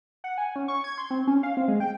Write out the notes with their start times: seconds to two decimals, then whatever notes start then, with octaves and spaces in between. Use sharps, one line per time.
0.24 F#5
0.38 G#5
0.56 C#4
0.68 C#6
0.84 G#6
0.98 C6
1.11 C4
1.27 C#4
1.43 F5
1.57 C4
1.68 G#3
1.80 G5